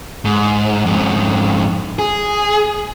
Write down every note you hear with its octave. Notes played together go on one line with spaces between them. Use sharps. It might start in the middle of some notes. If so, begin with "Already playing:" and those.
G#2
F2 G#2
G#4